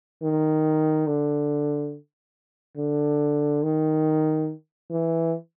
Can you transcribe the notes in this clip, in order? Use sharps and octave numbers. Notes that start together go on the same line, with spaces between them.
D#3
D3
D3
D#3
E3